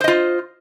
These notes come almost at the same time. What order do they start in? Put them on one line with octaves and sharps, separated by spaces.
C5 D#5 F4